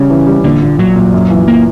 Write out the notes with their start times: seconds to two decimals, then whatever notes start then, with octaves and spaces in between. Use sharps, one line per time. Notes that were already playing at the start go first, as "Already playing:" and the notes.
Already playing: C#3 G3 C#4
0.10 E3
0.27 G3
0.44 A#1 D3
0.62 A#2
0.79 A#2 F#3
0.96 A#2
1.13 F#2
1.30 E3
1.48 A#3